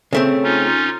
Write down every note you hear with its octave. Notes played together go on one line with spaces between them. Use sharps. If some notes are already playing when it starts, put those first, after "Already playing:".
C#3 A3 C4
C#4 D#4 F4